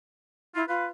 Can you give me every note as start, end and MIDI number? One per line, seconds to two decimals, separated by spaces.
0.55 0.64 64
0.55 0.63 65
0.68 0.87 65
0.68 0.86 71